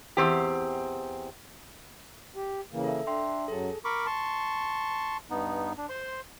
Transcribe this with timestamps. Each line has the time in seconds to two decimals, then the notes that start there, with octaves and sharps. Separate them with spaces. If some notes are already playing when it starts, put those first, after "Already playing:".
0.17 E2 B2 C4 G4
2.36 G4
2.72 C#3 E3 A#3
2.84 A4 E5
3.07 D4 E5 G5 C6
3.48 F#2 F#3 G#4 A4
3.85 A#4 B5 C#6 D6
4.06 A5 C6 C#6
5.30 G2 B3 D#4
5.77 D4
5.89 C5 C6